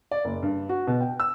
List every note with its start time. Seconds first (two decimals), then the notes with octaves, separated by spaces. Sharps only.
0.11 D5
0.25 F#1
0.43 G2
0.69 F#4
0.87 B2
1.01 G5
1.20 E6